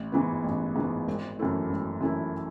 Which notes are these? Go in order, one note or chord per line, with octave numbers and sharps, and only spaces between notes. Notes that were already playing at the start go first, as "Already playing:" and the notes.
Already playing: A1
G#2 E3 B3
A1
G#2 E3 B3
G#1
F#2 E3 A3 E4
G#1
F#2 E3 A3 E4